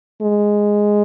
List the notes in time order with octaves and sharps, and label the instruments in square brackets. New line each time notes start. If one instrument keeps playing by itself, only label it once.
[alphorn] G#3